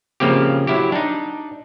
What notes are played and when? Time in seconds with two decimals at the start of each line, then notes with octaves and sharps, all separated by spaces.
0.20 C#3 F3 A#3 C4 G4
0.67 F#3 E4 G4
0.92 D4 D#4